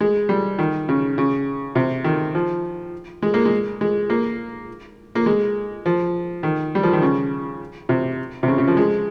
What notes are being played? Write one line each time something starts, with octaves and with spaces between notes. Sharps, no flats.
G#3
G3
D#3
C#3
C#3
C3
D#3
F3
G#3
A#3
G#3
G#3
A#3
A#3
G#3
F3
D#3
G3
F3
D#3
C#3
C3
C3
C#3
C#3
F3
G#3